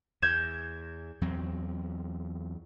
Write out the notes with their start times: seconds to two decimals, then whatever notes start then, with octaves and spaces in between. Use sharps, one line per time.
0.22 E2 G6 G#6 E7
1.21 E2 F#3 C4